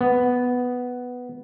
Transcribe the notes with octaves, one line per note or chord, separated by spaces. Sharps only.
B3